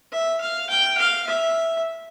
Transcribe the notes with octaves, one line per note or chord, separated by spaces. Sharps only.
E5
F5
G5
F5
E5